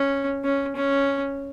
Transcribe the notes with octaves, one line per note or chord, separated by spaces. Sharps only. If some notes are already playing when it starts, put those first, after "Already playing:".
Already playing: C#4
C#4
C#4